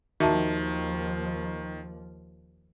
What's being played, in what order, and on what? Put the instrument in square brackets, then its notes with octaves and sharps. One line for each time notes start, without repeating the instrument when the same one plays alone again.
[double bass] D#2 F3 [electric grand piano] D#3 [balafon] F#4 E5 A5